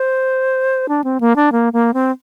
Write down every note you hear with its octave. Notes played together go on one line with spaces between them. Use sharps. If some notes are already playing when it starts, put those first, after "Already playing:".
Already playing: C5
D4
C4
A#3
D4
A#3
A#3
C4